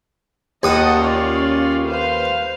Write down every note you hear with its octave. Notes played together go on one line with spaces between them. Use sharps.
D#2 D#5 F#5 A5 D#6
C#4 F4 D5
B4 C5 F5